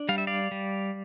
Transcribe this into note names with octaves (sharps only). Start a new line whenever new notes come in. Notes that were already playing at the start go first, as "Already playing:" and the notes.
Already playing: D4
G3 F5
E5
D5 F5
G3